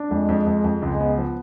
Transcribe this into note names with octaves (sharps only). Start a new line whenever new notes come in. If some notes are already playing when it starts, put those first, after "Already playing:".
Already playing: D4
F2 G#3
F2
F2
F2
C#2 G#3
B3
F3